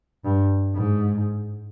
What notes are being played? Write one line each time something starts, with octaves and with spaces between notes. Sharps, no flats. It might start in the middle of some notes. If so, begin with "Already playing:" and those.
G2
G#2